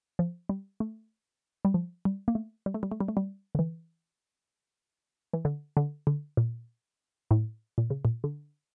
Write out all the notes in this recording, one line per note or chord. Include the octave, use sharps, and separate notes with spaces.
F3
G3
A3
G3
F3
G3
A#3
A3
G3
A3
G3
A3
G3
A3
G3
D3
E3
E3
D3
D3
D3
A#2
A2
A#2
C#3
A#2
D3